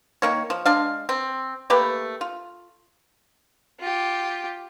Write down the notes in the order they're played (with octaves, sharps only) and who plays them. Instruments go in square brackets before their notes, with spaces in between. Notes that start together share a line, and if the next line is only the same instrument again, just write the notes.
[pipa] D#3 A#3 C#5
F3
G#3 D4 F5
C4
A3 A#3 G4 B4
F4
[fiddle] F4 G4